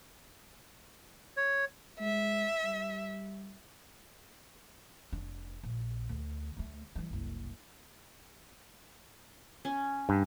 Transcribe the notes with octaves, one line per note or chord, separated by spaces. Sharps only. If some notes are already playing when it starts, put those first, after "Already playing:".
C#5
G#3 E5
G3
F1 D4
A#1
D2
D2 A3
E3 G3
F#1 C2
C#4
G2